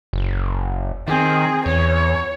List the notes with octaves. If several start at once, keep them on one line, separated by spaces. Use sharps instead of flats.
F#1
D#3 C4 G#4
E2 C#5